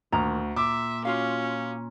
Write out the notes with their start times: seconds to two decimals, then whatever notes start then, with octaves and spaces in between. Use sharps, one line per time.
0.12 D2 A#2 D#3 A#5
0.56 A#2 E5 D6
1.05 C#4 F4 F#4 F5